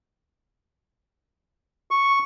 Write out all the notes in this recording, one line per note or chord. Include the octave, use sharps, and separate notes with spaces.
C#6